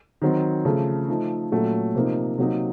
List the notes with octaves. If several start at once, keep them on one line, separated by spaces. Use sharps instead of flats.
D#3 F#3 C4
C#3 F3 A3
F3 A3 D#4
A#2 F#3 A3 C#4
C3 F3 A#3 D#4
C3 F#3 A#3 D#4